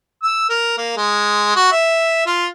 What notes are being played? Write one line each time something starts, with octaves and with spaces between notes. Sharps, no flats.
E6
A#4
A#3
G#3
F#4
E5
F4